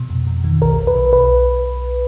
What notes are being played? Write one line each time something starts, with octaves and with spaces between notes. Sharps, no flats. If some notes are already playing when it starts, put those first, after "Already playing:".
Already playing: B2
F2
F2
D#3
B1 A#4
B1
B4
B2
B1 B4